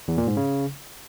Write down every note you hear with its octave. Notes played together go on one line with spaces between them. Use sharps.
E2
A#2
G#2
C#3